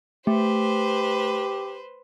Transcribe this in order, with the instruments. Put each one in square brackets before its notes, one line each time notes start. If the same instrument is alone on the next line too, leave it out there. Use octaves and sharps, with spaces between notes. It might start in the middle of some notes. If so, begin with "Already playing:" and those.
[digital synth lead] A3 [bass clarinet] G4 [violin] B4 C5